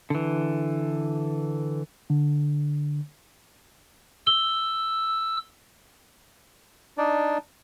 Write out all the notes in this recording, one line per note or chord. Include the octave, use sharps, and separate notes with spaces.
D3 E3
D3
E6 G7
D4 D#4 D5